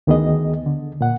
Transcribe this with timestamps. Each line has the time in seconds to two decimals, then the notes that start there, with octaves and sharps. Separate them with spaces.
0.07 D2 D#3 B3 G#4 D#5
0.66 D3
1.01 A#2 F#5